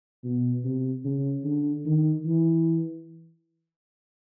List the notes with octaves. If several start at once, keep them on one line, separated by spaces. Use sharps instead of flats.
B2
C3
C#3
D3
D#3
E3